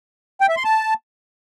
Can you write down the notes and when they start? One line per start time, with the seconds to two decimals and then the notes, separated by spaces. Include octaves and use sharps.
0.41 G5
0.49 E5
0.57 C6
0.65 A5